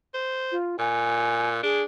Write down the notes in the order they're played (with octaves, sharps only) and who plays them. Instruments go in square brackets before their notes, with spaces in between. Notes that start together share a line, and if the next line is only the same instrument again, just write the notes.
[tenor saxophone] C5
[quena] F4
[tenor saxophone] A#2 [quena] G#5
[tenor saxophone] D4 [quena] G#4